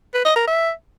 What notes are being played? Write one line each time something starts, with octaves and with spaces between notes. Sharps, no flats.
B4
D#5
A#4
E5